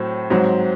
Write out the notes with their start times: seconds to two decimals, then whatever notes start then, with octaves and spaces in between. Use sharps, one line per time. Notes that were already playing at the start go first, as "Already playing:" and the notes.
Already playing: A2 F#3 C4
0.30 G#2 F#3 C4